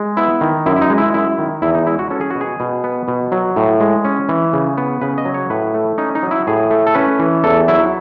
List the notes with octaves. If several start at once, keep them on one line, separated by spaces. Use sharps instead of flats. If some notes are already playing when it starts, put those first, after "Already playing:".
Already playing: G#3
B3 E4
D#3
F#2 E4
E4
D#4
G#3
E4
F#2 E4
D#3
E2 E4
D#4
G#3 E4
F#4
C#4 A4
G#4
B2 F#4
G#4
B2
B3
B2
F#3
A2
G#3
C#4
E3
C#3
B3
C#3 B4
D#5
F#3
C#5
A2 B4
A3
C#4 D#4
D#4
F#3
E4
A2 G#4
A3
A4
C#4 B4
E3
E2 A4
F#3 E4